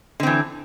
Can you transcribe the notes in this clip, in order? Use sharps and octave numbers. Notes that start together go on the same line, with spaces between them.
D3 E3 C4